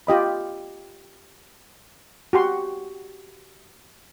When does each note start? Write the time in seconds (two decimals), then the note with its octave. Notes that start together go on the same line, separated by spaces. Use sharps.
0.07 F4 G4 D#5 B5
2.33 F#4 G4 C6